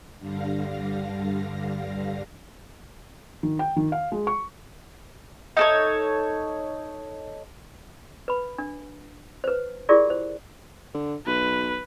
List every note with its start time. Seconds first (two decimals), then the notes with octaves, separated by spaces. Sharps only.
0.19 G2 D3 G3 F5 A#6
3.43 D#3
3.59 G5
3.76 D#3
3.92 F5
4.12 G#3
4.27 C#6
5.57 D#4 A4 C#5
8.28 B4 B5
8.58 D4
9.44 B4 C5
9.89 E4 F4 G4 G#4 A#4 D5
10.10 C5
10.94 D3
11.27 B1 B4